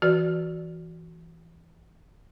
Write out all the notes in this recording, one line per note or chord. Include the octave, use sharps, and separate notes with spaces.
E3 F#4 B4 D5 F6